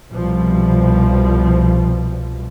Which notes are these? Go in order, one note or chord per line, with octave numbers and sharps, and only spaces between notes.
C2 B2 F3 G3